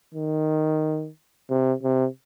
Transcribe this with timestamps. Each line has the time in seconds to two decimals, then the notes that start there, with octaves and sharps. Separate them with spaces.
0.14 D#3
1.49 C3
1.83 C3